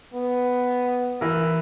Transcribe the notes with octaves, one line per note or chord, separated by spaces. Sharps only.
B3
E3 A#4